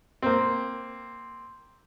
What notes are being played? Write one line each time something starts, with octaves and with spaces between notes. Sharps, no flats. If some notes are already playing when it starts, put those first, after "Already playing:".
A#3 C4